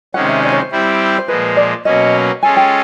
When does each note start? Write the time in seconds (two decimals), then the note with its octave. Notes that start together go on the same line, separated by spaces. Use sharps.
0.14 C3 D#3 G#3 C#4 F#5
0.29 E5
0.43 D5
0.52 C#5
0.62 C5
0.71 G3 C4 E4 G4
1.18 C5
1.28 A#2 F3 G#3 B4
1.57 D5
1.85 B2 F#3 A#3 C#4 D#5
2.43 G#3 C#4 F4 A4 G#5
2.57 G5